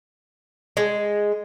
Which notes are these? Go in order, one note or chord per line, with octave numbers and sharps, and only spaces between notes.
G#3